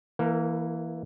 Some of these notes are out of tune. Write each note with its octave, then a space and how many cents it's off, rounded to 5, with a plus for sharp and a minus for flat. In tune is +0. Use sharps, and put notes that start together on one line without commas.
E3 +0 A#3 +10 A#4 -30